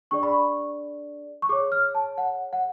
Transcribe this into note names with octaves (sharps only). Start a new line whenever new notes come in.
D4 G#4 D5 C#6
B5
C#6
C#6
G#4 C#5 D6
F6
A5
F#5
F#5